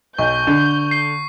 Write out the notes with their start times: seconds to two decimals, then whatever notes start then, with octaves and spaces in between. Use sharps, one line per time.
0.19 B1 C#6 G6
0.47 D3
0.91 C7